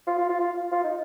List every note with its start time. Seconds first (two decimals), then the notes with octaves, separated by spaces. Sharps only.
0.07 F4
0.18 F4
0.29 F4
0.40 F4
0.72 F4
0.84 D#4